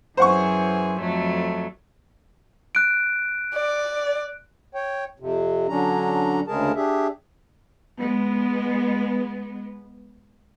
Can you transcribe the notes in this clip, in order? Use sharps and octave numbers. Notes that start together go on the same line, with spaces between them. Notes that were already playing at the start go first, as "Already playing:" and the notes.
F#2 E3 G#4 C5 F#5 C#6
F2 F#3 A3
F#6 D7
D5
C#5 G5
F2 C3
D3 F#3 C#4 D4 A#5
D2 C#3 G#3 G#4 A#4 A5
D4 G4 G#4 E5
G#3 B3